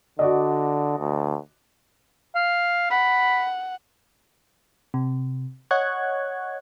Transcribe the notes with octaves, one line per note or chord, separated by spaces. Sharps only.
D3 F#4 D5 D#5
D2
F5
F#5 B5
C3
C#5 D#5 F#5 C#6 F#6 G#6